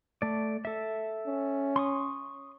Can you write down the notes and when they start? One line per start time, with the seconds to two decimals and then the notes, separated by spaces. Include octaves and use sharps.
0.22 A3 D5
0.65 A4 E5
1.26 C#4
1.76 C6 C#6 D#6